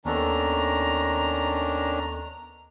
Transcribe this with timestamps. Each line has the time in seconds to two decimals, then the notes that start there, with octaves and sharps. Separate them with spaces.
0.05 D#2 D#3 B3 C#4 D4 A4 A#5